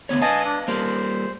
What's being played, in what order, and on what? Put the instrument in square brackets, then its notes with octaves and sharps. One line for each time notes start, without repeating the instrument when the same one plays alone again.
[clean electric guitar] D2 B3 C#5
[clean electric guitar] B4 F5 [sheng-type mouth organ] D#5 G#5 A5
[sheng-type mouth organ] D4
[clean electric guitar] G3 A#3 [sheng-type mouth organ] C5